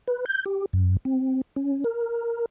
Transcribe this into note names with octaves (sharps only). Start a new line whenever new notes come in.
B4
G6
G4
F#2
C4
C#4
A#4